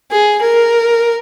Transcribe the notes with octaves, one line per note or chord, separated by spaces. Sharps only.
G#4
A#4